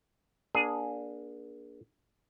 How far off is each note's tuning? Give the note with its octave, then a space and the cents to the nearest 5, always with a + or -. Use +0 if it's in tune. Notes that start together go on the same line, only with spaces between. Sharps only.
A#3 +35 D4 +0 G#4 +0